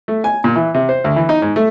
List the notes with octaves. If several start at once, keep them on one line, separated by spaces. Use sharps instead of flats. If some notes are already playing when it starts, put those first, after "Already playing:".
A3
G#5
A#2
E3
C3
C5
D2
E3
D#4
G#2
A3